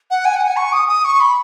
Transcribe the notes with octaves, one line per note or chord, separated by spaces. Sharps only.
F#5
G#5
F#5
G#5
C#6
D#6
D#6
C#6
B5